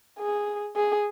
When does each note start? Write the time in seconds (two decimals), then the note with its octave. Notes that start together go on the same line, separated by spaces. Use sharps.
0.19 G#4
0.76 G#4